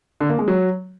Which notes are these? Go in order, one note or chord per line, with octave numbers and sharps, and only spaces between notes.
D3
A#3
G#3
F#3